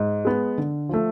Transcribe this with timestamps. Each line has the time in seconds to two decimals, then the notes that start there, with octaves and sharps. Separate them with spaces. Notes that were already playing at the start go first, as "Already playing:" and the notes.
Already playing: G#2
0.25 G#3 B3
0.58 D3
0.89 F3 A3